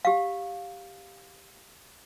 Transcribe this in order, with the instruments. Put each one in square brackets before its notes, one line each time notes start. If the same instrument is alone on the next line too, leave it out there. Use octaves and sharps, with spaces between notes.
[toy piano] G4 F5